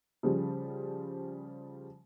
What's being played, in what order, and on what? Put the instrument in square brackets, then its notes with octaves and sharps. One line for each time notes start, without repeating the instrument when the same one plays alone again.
[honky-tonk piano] C#3 F3 G3